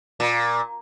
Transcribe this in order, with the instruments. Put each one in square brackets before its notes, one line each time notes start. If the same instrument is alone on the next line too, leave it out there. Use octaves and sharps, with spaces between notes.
[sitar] A#2